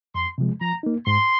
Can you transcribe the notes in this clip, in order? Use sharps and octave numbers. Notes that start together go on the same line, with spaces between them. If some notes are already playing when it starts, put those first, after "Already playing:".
F2 C6
C3 F3 G#3
F3 A#5
A#3 D#4
G#2 C6